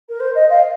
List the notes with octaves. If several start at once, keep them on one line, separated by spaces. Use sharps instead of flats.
A#4
C5
D#5
F5